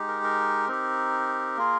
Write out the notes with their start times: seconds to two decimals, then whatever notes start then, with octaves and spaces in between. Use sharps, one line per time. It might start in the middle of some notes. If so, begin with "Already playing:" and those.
Already playing: G#3 D#4 G4
0.08 A#4
0.23 A#4
0.67 C4 D#4 G4
1.57 A#3 F4 G#4